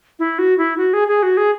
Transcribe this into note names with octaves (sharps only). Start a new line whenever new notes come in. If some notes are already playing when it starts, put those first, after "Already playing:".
E4
F#4
E4
F#4
G#4
G#4
F#4
G#4